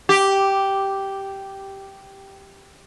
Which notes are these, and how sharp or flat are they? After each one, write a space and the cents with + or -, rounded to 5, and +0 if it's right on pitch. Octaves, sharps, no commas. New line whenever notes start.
G4 -5